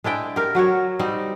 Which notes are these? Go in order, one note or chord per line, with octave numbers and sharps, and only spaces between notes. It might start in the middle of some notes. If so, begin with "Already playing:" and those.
G#3 D4 E4 G5
G4 A#4
F#3 F#4 A#4 C#5
G3 C4 D#4